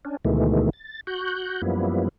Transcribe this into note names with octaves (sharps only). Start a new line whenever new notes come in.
C#4 D4
D2 B2 D#3 E3 G#3 A3
A6
F#4 F#6 G6
F#2 F3 G3 A#3 B3 E4